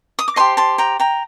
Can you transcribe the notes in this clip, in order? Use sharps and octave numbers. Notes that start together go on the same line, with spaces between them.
D#6
D6
G4 C5 D#5 A5 C6
A5 C6
G5 A#5
G5 A#5